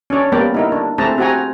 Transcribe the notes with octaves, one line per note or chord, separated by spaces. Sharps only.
C#4 D4 C#5 D5
G3 A#3 B3 A#4 D5 G5
D#4 E4 A#4
D4
A3 C4 E4 G#4 A5 A#5
C4 F#4 G4 F#5 G#5 A#5